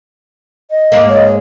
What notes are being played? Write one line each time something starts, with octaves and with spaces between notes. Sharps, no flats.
D#5
G#2 G#3 A#3
C#5